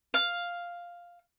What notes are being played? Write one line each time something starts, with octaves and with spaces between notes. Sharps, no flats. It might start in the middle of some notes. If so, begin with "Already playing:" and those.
F5